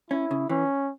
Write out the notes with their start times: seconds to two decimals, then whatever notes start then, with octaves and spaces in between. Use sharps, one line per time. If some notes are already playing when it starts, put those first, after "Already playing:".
0.10 C#4 E4
0.31 C#3
0.49 E3 C#4